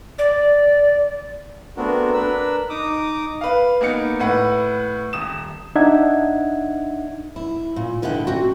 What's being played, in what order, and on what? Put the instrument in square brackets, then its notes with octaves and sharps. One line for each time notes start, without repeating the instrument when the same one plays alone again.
[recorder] D5
[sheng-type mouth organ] A3 B3 C4 D4 F#4 A#4
D4 A#4 B4 E6
D#4 D6 D#6
[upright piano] B4 F5
A#3 B3 D#4 C#7
A2 B4 F#5
D#1 D#6 E7
[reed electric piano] D4 D#4 E5 F#5 G#6
[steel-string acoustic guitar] E4
A#2
D#2 D3 E4 A4 F#5 G5
C4 F#4